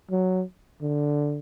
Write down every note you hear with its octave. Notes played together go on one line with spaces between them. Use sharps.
F#3
D3